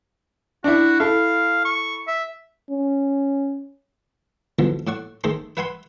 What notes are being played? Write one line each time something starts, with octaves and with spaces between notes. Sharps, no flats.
D4 E4 F#4
E4 A4 F5
C#6
E5
C#4
D2 B2 D3 E3 F3
A2 D5 F#5 C#6
D#3 A3 G#4 A4 C5
B4 E5 F#5 G#5 B5 C6